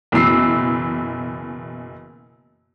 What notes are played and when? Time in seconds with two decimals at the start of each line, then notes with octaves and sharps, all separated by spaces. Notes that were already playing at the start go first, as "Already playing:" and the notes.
0.12 F#1 B2 E3 E6 C7